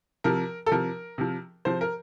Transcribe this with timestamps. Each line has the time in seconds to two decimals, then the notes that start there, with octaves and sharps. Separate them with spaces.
0.24 C3 F3 A#4
0.66 A4
0.71 C3 F3 A#4
1.18 C3 F3
1.65 C3 F3 C5
1.81 A#4